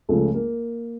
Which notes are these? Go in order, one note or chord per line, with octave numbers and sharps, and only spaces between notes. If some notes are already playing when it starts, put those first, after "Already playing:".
C#2 C#3 F3 A3 A4
A#3 A#4